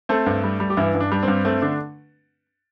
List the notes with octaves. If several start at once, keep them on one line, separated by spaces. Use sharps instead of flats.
A3 C4 A4
G2
G3
G3
G4
G2 E3 E4
G2
D4
G3 D4
G2 C4
A3 C4
D3 D4